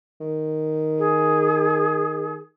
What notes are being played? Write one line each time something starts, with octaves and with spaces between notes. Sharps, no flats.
D#3
G#4